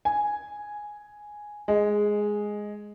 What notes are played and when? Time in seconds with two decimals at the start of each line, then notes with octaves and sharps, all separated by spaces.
0.05 G#5
1.68 G#3